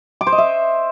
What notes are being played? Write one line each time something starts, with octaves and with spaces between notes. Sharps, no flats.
D6
C5
D#5
E5